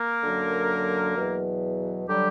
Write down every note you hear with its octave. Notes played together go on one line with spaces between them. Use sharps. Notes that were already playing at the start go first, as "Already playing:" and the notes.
Already playing: A#3 A#4
F#2 D3 F#3
E2 B2 F#3
D3 F#3 G3 G4